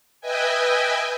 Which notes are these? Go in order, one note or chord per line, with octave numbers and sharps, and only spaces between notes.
B4 D#5 E5 G5 G#5